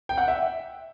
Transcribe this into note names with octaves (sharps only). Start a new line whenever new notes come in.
G5
F#5
E5